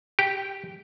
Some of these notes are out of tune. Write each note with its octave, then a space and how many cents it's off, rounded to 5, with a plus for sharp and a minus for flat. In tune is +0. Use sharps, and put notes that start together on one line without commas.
G4 +0 G5 -15